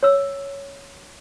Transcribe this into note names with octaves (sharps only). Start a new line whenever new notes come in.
C#5 E6